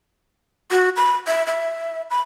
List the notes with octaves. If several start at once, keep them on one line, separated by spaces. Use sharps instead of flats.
F#4
B5
E5
E5
B5